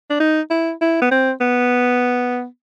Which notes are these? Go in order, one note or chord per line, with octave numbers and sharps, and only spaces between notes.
D4
D#4
E4
E4
B3
C4
B3